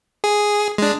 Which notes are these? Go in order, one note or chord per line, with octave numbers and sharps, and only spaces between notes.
G#4
G#3 D4